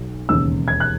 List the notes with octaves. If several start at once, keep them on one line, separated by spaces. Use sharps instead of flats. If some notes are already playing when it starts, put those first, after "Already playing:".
Already playing: B1 F#3
E1 D#2 C#3 E6
G#6
F#6